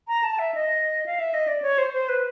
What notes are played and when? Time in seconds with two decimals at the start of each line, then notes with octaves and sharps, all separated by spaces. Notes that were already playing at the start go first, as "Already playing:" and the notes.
0.08 A#5
0.23 A5
0.39 E5
0.54 D#5
1.06 F5
1.19 E5
1.34 D#5
1.47 D5
1.62 C#5
1.78 C5
1.94 C5
2.09 B4